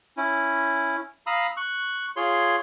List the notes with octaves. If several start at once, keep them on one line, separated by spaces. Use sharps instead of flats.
C#4 E4
F5 A#5 B5 D#6 E6
C#6 F#6
F4 G#4 C#5 C6